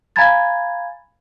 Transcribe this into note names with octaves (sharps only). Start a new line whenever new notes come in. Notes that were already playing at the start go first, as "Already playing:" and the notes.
F5 G#5 A#5 B5 G#6 A6